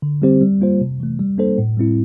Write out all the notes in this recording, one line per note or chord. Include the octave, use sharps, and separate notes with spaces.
D3
G3 C4 G4 C5
G3
A#3 F4 C5
C3
E3 A3
G3
A#3 D4 A4 C5
A2
G3 C4 E4